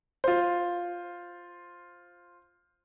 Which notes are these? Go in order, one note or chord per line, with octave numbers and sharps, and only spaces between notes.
F4 C5